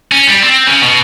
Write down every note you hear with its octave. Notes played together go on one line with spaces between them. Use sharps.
C#4
G3
C4
C#3
B2